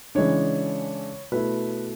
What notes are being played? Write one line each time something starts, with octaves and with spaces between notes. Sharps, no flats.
C#3 E3 G#3 D4 C#5
B2 A3 E4 B4